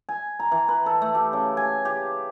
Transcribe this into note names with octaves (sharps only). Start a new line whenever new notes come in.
G#5
A#5
E3
B4
A4
A3
G4
C#3
G#5
G4